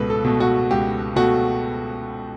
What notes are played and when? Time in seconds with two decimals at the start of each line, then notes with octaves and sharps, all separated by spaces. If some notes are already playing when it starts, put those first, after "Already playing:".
Already playing: C#2 B2 A3 B4
0.10 A4
0.24 B2 A3
0.40 F#4
0.71 C#2 G4
1.16 B2 A3 F#4